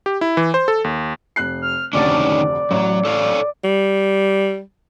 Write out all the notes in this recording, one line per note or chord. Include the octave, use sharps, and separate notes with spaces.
G4
E4
E3
C5
A4
D#2
F1 F#6 C7
F6
F1 D2 D3 D#3 C#4 D4 D5
A1 F#3
A4 C#5 F5
G3